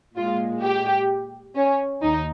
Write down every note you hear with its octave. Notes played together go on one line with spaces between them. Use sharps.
A#2 G#3 F4
G4
C#4
D#2 D#4